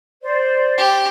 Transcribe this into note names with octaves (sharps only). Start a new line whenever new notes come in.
C5 D5
G4